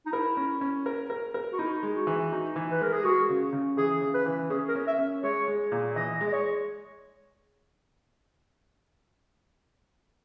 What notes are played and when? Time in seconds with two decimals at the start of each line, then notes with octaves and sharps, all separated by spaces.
0.06 D#4
0.12 E4 A#4
0.37 C#4
0.61 C#4
0.86 A#4
1.10 A#4
1.34 A#4
1.53 F#4
1.59 D#4 E4
1.83 G#3
1.95 F#4
2.07 E3
2.32 D#4
2.56 E3
2.72 B4
2.81 G#3 A#4
2.93 G#4
3.04 G#3 F#4
3.29 C#3
3.53 C#3
3.77 E3 G#4
4.01 C#3
4.14 B4
4.26 E3
4.50 C#4 G#4
4.69 A#4
4.75 C#4
4.87 E5
4.99 C#4
5.23 G#3 C#5
5.48 G#3
5.72 A#2
5.96 E3 D#5
6.21 G#3
6.28 D#5
6.33 C#5